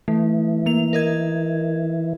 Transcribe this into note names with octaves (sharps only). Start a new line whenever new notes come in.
E3 A3
A#3 F7
A#4 D#5 G#6